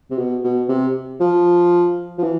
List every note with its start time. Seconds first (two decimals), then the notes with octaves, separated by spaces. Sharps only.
0.10 C3
0.18 B2
0.44 B2
0.69 C3
1.20 F3
2.18 F3
2.23 E3